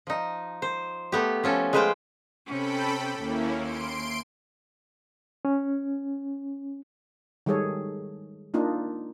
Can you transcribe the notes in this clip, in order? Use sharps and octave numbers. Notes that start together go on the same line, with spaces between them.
F3 D#4
C5
A3 B3 G4
F3 C#4 A4
G#3 A3 B4 C5 F5 G5
C3 C#4 A4 G5 B5
D#2 A#3 C#4 E4
C6 D7
C#4
D#3 G3 G#3 G#4 A4 C#5
A#3 D4 D#4 F4